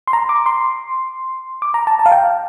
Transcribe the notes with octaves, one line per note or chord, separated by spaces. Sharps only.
C6
A#5
D6
C6
D6
A#5
A5
A5
F5
G5